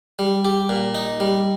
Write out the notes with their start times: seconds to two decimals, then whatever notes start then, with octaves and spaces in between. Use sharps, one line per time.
0.19 G3
0.45 G4
0.69 A#2
0.95 D#4
1.20 G3